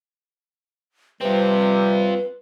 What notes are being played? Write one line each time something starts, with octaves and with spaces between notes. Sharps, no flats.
C3 G3 C4 F4 B4